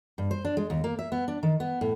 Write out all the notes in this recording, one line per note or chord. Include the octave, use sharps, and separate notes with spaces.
G2
C5
D4
G#3
D#2
A#3
E5
B3
D4
D#3
B3
A2